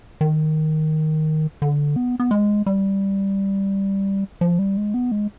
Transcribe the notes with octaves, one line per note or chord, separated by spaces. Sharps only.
D#3
D3
B3
B3
G#3
G3
F3
G3
G#3
B3
G#3